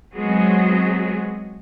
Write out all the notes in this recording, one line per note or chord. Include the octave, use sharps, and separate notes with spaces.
F#3 G#3 B3 C4 F#4 G#4